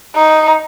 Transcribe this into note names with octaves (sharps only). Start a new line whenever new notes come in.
D#4